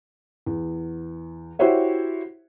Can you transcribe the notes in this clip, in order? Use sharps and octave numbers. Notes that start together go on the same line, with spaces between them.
E2
E4 F#4 G4 C5 C#5 E5